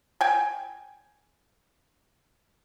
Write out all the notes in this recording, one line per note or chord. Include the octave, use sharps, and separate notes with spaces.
G5 G#5